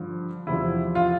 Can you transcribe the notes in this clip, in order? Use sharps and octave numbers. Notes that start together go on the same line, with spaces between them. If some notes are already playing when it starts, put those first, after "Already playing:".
Already playing: G2 D3 F3
E2 C3 F3 E4
F4